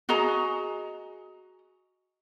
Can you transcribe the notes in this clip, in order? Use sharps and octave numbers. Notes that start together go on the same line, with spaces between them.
F#4 G#4 D#5 A#5